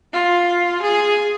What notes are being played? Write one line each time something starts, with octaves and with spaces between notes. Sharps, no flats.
F4
G#4